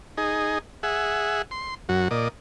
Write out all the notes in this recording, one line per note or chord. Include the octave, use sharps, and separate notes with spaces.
D#4 G#4
G#4 E5 F#5
C6
F#2 F#4
A#2 D5 D#5